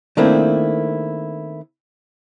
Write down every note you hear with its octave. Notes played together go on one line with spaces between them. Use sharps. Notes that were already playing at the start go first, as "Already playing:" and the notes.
D#3 A3 A#3 C4 D4 E4